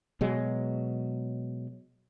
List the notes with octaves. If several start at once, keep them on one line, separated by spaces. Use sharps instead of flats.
B2 F#3 G#3